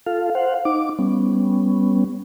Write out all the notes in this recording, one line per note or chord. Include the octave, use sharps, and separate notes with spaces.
F4 A4 F5
C5 F5 F#5
D#4 D6
G3 B3 C#4